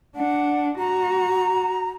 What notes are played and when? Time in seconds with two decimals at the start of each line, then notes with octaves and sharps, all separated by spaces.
0.16 D4 F#5
0.79 F#4 A#5